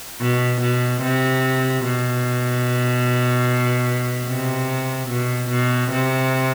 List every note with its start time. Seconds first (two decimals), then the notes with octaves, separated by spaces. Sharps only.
0.20 B2
0.61 B2
1.02 C3
1.84 B2
4.28 C3
5.10 B2
5.50 B2
5.92 C3